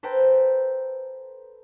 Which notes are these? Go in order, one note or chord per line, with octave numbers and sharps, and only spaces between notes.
A4 B4 C5 G5 A#5